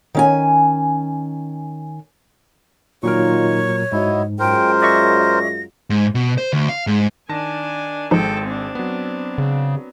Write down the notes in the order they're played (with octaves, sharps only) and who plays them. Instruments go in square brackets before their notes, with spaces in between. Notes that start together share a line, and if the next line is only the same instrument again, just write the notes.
[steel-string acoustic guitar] D#3 C#4 G#5
[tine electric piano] A#2 F#3 A#4 [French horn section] D#3 D#4 F4 [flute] C#5 [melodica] C#6
[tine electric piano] G#2 [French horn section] F#3 F#4 D#5 [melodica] E4
[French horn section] F#2 G#3 F4 [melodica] A#4 C5 [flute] G5
[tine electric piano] D5 E5 C#6 [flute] A#6
[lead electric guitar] G#2
B2
C5
D2
F5
G#2
[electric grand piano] D#3 A5 A#6 [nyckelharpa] D4 G#5
[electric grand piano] G#1 G#3 C5 [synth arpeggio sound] F3 D#4 [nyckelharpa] A4 G5
[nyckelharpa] C4 D4
[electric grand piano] F#3 B3
[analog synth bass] C#3